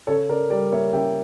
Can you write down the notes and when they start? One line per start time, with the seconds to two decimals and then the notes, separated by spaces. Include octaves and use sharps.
0.07 C#3 A4 C#5
0.29 C#3 A#4 D5
0.50 G3 A#4 D5
0.72 A#3 C#5 E5
0.93 C#3 E5 G5